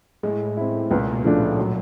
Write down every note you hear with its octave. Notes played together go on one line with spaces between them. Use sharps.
A2 G#3
C4 E4
C#2 A#2
B2
A#2
C#3 F3 A3 D4
F#3